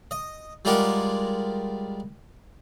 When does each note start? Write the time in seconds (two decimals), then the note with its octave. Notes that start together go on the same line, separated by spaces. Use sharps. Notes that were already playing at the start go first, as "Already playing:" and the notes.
0.11 D#5
0.65 G3 G#3 F4 G4 A#4 F#5